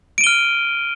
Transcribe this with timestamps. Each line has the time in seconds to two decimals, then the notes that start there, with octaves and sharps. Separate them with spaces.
0.18 D7
0.21 D#7
0.24 G7
0.27 F6